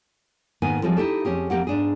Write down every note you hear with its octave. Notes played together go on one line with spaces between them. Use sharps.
G#2 D#3 A#3 B3 G#5
F3 G3 G#3 C4 F4 A4
D#4 E4 G4 A4
F2 C#4 G4 G#4
F2 D#3 A#3 G4 F#5
G#2 D4 G#4